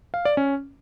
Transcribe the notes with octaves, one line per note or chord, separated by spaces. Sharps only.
F5
D5
C#4